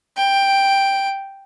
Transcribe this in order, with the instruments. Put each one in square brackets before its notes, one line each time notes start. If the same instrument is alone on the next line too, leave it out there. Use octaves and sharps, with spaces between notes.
[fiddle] G5